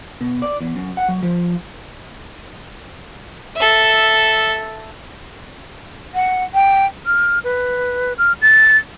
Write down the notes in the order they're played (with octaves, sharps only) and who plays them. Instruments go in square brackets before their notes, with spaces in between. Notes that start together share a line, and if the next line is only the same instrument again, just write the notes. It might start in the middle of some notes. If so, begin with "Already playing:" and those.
[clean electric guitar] B2
D5
E2
F#2
F#5
F#3
F3
[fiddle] A4 E5
[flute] F#5
G5
F6
B4
F6
A6